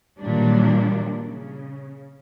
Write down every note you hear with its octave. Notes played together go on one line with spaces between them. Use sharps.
A#2 D#3 E3 F#3 G3 D4
C#3